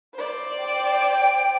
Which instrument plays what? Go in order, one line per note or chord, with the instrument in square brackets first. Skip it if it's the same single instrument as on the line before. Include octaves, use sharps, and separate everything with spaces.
[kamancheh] C5 D5
[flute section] G5